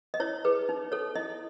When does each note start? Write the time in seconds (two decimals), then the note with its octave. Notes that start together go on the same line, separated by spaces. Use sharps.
0.14 D#5
0.20 E4 C#5
0.45 G#4 B4
0.69 D#4
0.92 A4 C#5
1.15 E4 D#5